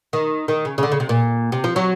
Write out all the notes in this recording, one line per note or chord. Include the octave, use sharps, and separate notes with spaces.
D#3
D#3
C#3
C#3
D3
C#3
C3
A#2
C3
F3
F#3